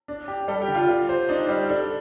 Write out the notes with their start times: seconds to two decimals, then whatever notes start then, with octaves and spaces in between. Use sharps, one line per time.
0.08 D4
0.28 G4
0.48 G3 A4
0.62 G4
0.68 D3
0.75 F4
0.88 G4
1.09 C5
1.29 D4 D#4
1.49 G3
1.69 D4 A4